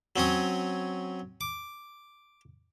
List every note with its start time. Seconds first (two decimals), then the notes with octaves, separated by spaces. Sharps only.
0.16 F#3 C4 C#4 D#6
1.41 D6